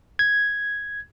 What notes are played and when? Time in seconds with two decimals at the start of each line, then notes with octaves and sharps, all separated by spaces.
0.19 G#6